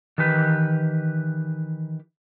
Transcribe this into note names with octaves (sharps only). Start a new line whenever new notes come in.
D#3 E3 G4 B4